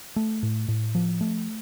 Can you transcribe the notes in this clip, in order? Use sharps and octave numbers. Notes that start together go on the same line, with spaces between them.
A3
A2
A2
F3
A3